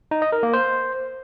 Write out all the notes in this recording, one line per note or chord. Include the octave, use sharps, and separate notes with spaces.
D#4
D#5
A#4
A#3
C5